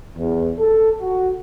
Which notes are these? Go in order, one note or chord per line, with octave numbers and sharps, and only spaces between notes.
E2
A4
F#4